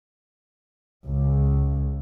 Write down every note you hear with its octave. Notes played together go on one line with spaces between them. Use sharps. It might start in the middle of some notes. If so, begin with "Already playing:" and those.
C#2